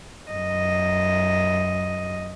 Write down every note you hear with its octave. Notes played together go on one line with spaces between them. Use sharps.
F#2 D#5